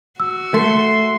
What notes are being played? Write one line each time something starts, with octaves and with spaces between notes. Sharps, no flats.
F#4 E6
A3 C6